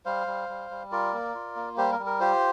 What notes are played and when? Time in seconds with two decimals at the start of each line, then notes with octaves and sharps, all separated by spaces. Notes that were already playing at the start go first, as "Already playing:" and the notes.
0.05 G3 C5 F5
0.27 G3
0.49 G3
0.71 G3
0.92 F4 A#4 D5
1.13 A#3
1.35 F4
1.56 A#3
1.77 G3 G4 C5
1.91 A#4
1.99 G3
2.06 A#4
2.20 F4 G4 C5